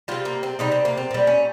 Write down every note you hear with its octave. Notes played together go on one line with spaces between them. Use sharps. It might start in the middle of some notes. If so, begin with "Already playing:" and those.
C3 G3 F4
A#3
C4
C3 G3 D#4
C4
A#3
C4
A#2 G3
C#4